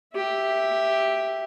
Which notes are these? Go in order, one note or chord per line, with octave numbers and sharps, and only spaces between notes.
G4 E5